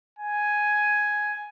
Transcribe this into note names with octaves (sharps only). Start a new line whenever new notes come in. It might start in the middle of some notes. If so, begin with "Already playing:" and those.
G#5